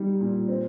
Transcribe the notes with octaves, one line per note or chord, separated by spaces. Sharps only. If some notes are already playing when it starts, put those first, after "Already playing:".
Already playing: G3 D#4
A#2
C4